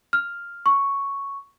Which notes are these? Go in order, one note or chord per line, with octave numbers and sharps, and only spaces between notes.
F6
C#6